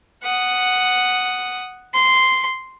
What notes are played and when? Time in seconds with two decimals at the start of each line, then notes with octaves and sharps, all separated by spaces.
0.23 F#5 D#6
1.94 C6